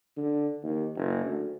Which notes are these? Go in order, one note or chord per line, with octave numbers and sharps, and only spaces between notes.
D3
D#2
F#1
D2